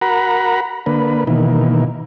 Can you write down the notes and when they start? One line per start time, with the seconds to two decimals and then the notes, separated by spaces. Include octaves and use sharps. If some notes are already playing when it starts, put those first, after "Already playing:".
0.01 F#4 A#4 F#5 A#5 B5
0.86 D3 A#3 B4
1.27 B2 D#3 E3 A#3